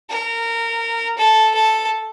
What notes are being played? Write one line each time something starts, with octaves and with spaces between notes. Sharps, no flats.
A#4
A4
A4